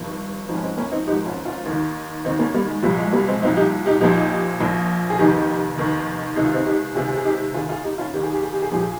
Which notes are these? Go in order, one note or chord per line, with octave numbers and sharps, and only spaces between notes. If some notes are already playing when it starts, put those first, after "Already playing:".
Already playing: G#1 G2 F3
G#1 G#2 F3
C#4
G#3 C4
A#3 C#4
C4 D#4
G#1 G#2 F3 D#4 G4
C#4 F4
C#4 F4
D#2 D#3
D#2 D#3 C4 D#4
A#3 C#4
G3 A#3
G#3
C2 A#2 F3 G3
G#3
G3 A#3
G#3 C4
C2 A#2 F3 C4 D#4
D#4 G4
D#4 G4
A#1 A#2 F3 D#4 G4
A#1 A#2 F3
G#4
F1 D#2 D#3 D#4 G4
F1 D#2 D#3
C#2 C3 D#3 D#4
F4
C4 D#4
D#4 G4
C#2 C3 D#3 F4 G#4
G#4
D#4 G4
D#2 D#3 F4 G#4
F4 G#4
D#4 G4
C#4 F4
D#2 D#3 G4
G#4
G4
G#4
G4
G#4
A#1 A#2 F3 G4
G#4